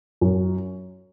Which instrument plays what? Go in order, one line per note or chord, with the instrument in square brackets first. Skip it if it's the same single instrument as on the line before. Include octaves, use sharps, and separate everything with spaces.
[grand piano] F#2